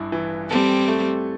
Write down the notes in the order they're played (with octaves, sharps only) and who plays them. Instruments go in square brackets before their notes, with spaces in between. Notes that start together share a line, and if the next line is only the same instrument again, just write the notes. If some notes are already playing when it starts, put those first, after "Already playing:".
Already playing: [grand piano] A1 G2 E4
E3
[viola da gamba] G3 C4 [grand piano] A4
[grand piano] A3